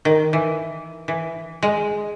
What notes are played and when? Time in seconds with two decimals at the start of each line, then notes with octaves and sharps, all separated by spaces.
0.05 D#3
0.33 E3
1.08 E3
1.63 G#3